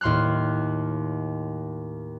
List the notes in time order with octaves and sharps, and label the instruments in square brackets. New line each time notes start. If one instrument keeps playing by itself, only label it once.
[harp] D#2 A2 C6 F6 F#6